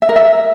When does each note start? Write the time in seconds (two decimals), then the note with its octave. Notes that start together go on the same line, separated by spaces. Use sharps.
0.02 E5
0.09 A#4
0.16 E5